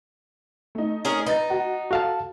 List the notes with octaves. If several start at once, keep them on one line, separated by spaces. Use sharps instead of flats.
A3 D#4
C#4 G#4 A#4
D#4 B4 A6
F#4
F#4 A4 F5 A5